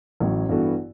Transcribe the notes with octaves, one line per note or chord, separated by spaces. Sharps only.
A1 A2 F#3
G2 E3 B3 F#4 A4